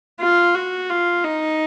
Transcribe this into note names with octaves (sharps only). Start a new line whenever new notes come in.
F4
F#4
F4
D#4